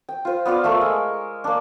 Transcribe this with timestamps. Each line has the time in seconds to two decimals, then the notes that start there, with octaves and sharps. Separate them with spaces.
0.09 G5
0.25 F4 C5
0.46 B3 F4 D5 F5
0.64 A3 A#4 C#6 E6
0.81 G#3
1.44 A#3 D4